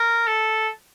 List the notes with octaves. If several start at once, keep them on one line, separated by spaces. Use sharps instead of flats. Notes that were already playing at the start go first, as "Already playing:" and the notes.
Already playing: A#4
A4